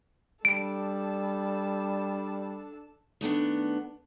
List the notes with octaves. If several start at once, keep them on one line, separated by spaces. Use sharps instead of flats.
G3 D4 A4 D7
D#3 A3 B3 D4